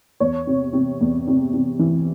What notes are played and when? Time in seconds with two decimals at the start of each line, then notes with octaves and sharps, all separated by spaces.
0.20 E2 C#5
0.47 C3
0.73 C3
1.01 E2
1.27 C3
1.53 C3
1.79 E3